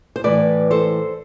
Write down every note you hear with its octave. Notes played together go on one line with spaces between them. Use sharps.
C5
A2 E3 B4 D5
A4 C5